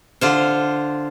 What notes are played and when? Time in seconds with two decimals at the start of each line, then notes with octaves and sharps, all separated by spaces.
0.21 D3 F4 C5